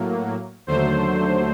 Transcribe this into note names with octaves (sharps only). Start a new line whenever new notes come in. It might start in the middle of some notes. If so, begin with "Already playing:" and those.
Already playing: A2 F#3 A#3
D#2 D3 F#3 A3 C5